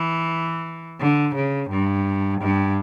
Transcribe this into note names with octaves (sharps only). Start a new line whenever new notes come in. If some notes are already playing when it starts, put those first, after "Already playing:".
Already playing: E3
D3
C#3
G2
G2